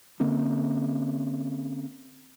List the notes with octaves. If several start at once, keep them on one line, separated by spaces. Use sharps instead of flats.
D3 A#3 C4 C#4